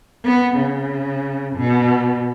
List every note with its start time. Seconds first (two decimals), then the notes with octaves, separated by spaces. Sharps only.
0.25 B3
0.57 C#3
1.56 B2